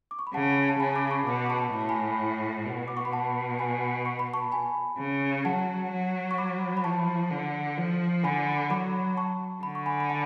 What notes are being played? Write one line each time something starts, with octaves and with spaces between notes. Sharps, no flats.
D6
C#6
B5
C#3 F#5 A5
A5
C#3 G#5 B5
B5 D6
A5 C#6
B2 B5 D6
D6
A5 C#6
A2 B5
A5
G#5 B5
B2
D6
C#6
B5
F#5 A5
G#5 B5
C#6
B5
A5 C#6
G#5 B5
C#3
F#3 F#5 A5
F#3
C#6
B5 D6
B5
F3 A5 C#6
D3
F3
D3 G#5 B5
F#3 B5 D6
A5 C#6
D3 B5
C#6
G#5 B5
B5
F#5 A5